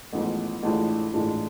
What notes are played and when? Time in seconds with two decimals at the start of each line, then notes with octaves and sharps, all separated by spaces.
0.13 A1 G#2 F3 B3
0.63 A1 A2 G#3 D4 F4
1.13 A1 A2 G#3 D4 F4